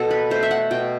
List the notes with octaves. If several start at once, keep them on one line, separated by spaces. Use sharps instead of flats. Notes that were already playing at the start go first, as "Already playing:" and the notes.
Already playing: B2 A4
B4
A3 C5
E5
F#5
B2 G5